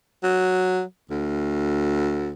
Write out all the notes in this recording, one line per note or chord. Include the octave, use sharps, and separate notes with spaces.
F#3
D2